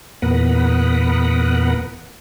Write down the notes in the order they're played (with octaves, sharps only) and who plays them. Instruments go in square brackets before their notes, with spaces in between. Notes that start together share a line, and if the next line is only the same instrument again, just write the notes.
[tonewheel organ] E2 A#2 B3 A#4 B4 F#5